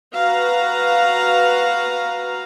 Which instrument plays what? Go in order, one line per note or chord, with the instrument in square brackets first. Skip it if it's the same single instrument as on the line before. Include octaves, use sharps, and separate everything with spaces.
[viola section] F#4 B4 F5 A#5